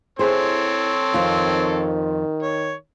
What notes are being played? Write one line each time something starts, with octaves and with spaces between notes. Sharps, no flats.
C4 E4 G#4 A4 C5 C#5
F2 D#3 F3 F4
C#5